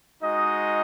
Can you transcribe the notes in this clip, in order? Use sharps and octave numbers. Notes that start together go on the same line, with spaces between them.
G#3 D#4 F#4 D#5